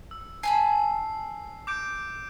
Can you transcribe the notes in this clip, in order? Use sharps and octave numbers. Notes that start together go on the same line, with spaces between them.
E6
G#5 A5 B5 C7
D6 G6 D7